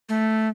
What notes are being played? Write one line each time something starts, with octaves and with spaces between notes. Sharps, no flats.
A3